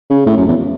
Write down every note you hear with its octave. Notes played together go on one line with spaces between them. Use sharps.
C#3
A2
F#2
E2